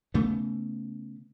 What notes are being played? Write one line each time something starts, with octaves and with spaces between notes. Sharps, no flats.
C#3 A3 B3